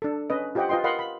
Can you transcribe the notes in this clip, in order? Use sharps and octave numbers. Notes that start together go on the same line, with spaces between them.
D4 A4
C#4 B4 D#5
F4 G4 C5 D#5 F#5 G5
F4 B4 D#5 G5 C6
A#4 D#5 F5 F#5 B5 C6
B5